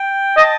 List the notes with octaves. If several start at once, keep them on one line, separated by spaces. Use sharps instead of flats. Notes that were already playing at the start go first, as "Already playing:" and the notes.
Already playing: G5
D#5 A5